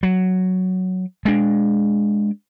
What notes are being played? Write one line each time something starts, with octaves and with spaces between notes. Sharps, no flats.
F#3
G#3 D4